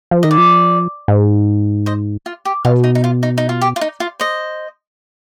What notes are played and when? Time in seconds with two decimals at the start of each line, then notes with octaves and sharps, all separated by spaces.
0.11 F3
0.23 D#3 D#5
0.31 D5
0.38 F3
1.08 G#2
1.86 C5 D#5
2.26 F4
2.45 G4
2.65 B2 F4
2.84 D#4
2.95 D#4
3.04 F4
3.23 D#4
3.38 D#4
3.49 F4
3.61 G4
3.76 F4
3.81 D#4
4.00 F4
4.20 C5 D#5